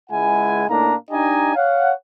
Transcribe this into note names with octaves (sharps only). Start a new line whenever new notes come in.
C#2 G#3 E4 F#5 G#5
A2 A#3 D4 D#4 F5 A#5
D4 D#4 G4 D#5 G#5 A#5
C#5 F5 F#5